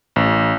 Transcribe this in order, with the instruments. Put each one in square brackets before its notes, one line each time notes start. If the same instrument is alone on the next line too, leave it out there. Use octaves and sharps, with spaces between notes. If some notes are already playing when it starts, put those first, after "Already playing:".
[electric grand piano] A1